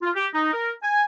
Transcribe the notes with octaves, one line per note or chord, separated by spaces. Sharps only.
F4
G4
D#4
A#4
G#5